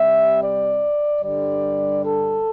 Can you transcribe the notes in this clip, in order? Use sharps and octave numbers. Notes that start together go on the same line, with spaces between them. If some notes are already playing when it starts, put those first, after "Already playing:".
Already playing: C3 G3 E5
D5
G2 D3 G3 D5
A4